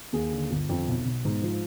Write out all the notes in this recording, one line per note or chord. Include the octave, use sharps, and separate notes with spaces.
D#2 G#4
D3
G1
F2
B1
B2
G#2
F3